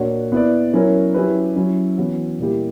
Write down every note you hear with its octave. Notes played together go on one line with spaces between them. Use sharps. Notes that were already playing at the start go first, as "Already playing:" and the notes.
Already playing: A#2 A#3 D4 F#4 C#5
B3 E4 B4 D5
F#3 C#4 E4 A#4 C#5
F#3 C#4 E4 G4 B4
F#3 C#4 E4
E3 B3 F#4 C#5
A#2 G3 A#3 E4 G4